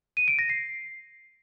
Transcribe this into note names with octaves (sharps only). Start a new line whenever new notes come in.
D#7
D7
A#6
C7